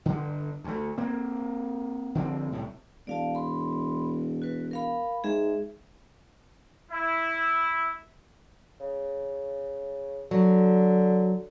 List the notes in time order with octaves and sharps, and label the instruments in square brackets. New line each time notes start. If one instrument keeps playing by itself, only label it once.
[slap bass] G2 D3
D2 A3
A#3 C4
D3 F3 A#3 C4
C2 A2
[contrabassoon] E1 [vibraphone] D5 F5 A5
[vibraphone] B5 C6
F#4 B4
A#4 F5 B5
[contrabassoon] G#2 [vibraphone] G#4 E5
[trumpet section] E4
[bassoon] C#3
[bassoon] D3 [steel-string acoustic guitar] F#3